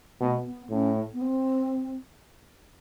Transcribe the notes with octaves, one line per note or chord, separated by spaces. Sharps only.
B2 A3
B3
A2 C#4
B3
C4